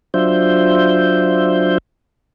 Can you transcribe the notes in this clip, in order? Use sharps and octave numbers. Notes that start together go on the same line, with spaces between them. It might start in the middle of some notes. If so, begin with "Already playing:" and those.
F#3 D4 F4 C5 E5 G6